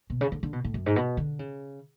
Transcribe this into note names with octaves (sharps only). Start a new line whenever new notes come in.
B2
C#3
D3
D3
B2
A2
F#2
G#2
B2
D3
C#3